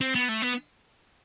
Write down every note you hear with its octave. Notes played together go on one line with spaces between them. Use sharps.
C4
B3
A3
B3